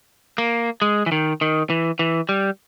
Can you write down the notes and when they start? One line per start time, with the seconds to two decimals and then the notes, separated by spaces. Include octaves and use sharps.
0.38 A#3
0.82 G#3
1.06 E3
1.12 D#3
1.41 D#3
1.70 E3
1.99 E3
2.29 G3